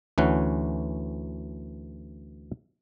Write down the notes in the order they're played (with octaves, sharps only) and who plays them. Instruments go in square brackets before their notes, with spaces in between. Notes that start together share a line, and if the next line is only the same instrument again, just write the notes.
[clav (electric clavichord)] D2 E3 C#4 F#5